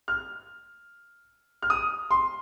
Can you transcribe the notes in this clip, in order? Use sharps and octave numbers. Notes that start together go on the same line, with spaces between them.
F6
F6
D#6
C6